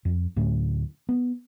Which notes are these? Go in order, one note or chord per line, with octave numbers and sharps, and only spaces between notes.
F2
D2 A2 F#3 C#4
B3